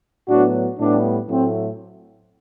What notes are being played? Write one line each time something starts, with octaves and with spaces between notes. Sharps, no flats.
A2 F#3 B3 D4 F#4
A2 G3 B3 D4
A2 F#3 A3 C4